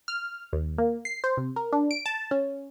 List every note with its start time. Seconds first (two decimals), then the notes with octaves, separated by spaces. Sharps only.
0.08 F6
0.53 D#2
0.78 A#3
1.05 C7
1.24 C5
1.37 C3
1.56 A#4
1.72 D4
1.91 D7
2.06 A5
2.31 C#4